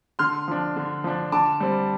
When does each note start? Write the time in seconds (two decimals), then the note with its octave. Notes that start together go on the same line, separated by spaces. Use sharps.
0.19 D3 C6 F6
0.48 F3 D4
0.76 D3
1.04 F3 D4
1.32 D3 A5 D6
1.60 G3 C4